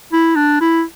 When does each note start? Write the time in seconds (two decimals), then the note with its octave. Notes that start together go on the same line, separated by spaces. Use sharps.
0.12 E4
0.36 D4
0.61 E4